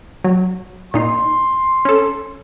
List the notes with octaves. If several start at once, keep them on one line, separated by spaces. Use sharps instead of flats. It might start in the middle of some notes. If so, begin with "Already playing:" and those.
F#3
A#2 D#4 C6 C7
C#4 A4